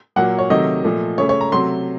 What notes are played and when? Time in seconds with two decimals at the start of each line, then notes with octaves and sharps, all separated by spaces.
0.16 A#2 F#3 A#3 F#5
0.39 C#5
0.50 C3 D#3 F#3 A3 D#5
0.84 A#2 F3 A3
1.18 C#3 A3 C#5
1.29 C#5
1.41 A#5
1.52 C3 F#3 A3 C6